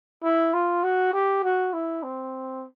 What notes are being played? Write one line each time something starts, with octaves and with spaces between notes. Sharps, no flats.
E4
F4
F#4
G4
F#4
E4
C4